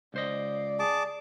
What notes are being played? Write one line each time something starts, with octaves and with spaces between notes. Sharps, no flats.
C#2 C5 D5 D#5
G#4 A5 D6